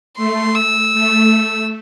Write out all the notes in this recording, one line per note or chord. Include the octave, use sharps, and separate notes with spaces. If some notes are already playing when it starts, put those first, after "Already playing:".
A3 C6
E6
A3